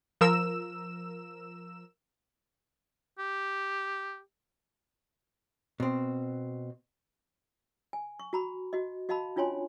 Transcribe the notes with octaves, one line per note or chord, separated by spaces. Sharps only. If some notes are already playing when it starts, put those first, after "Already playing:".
F3 A#4 E6 E7
G4
B2 C4
G#5
C#6
F#4 A#5 B5
F#4 D#5
F#4 D#5 F5 A5 B5
C#4 D4 F4 C#5 G#5 C6